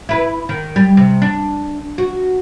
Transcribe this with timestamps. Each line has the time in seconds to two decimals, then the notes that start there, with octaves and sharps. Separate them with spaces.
0.09 E4 B4
0.49 D#3
0.76 G3
0.97 C3
1.22 D4
1.98 F#4